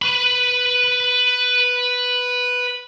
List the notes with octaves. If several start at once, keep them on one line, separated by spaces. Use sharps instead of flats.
B4 B5